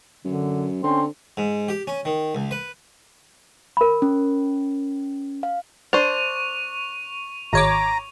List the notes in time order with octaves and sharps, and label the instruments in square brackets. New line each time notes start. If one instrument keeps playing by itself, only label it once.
[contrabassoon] F#2 [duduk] D3
[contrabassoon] D3 [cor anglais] C4 [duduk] C#4
[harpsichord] G#2
G4
C#4
D#3
C#2
B4
[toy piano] A#4 B5
[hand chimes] C#4
F5
[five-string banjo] D4 C5 [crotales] C#6 F7
[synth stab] G#1 C#5 D6 [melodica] A#5